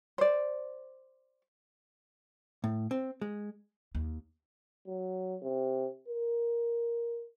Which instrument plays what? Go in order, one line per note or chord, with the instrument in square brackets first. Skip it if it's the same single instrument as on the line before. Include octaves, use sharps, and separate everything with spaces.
[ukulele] C5 D5
[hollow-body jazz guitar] A2
C4
G#3
[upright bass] D#2
[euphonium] F#3
C3
A#4